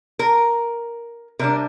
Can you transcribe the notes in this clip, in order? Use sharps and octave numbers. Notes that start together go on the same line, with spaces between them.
A#4
C3 G3 D4 A#4